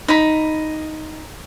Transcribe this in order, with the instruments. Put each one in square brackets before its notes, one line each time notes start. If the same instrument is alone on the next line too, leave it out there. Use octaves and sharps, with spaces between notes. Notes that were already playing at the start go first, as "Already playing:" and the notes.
[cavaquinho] D#4 B5